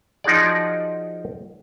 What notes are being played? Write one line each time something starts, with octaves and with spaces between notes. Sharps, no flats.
F3 D#4 F#4 G#4 D5